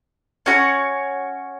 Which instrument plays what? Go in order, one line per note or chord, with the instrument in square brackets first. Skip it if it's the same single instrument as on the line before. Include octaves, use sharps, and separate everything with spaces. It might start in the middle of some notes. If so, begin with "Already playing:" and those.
[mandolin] C#4 F#4 A#4 C#5